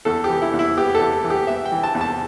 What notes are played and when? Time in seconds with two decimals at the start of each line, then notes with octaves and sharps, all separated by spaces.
0.05 E2 A4
0.24 G4
0.29 E3
0.42 E4
0.53 E2
0.59 E4
0.77 B3 G4
0.95 A4
1.01 E2
1.24 E3
1.30 G4
1.47 B3 E5
1.65 G5
1.72 E3
1.83 A5
1.95 E2
2.01 A5